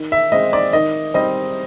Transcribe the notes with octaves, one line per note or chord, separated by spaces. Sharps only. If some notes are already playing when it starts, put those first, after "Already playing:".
Already playing: D#3
E5
G#3 C4 D#5
D5
D#3 D#5
G3 C4 D#4 D#5